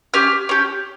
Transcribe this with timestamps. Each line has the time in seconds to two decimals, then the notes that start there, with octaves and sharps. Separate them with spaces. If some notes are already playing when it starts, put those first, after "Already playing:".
0.14 C#4 G4 F6
0.49 C#4 G4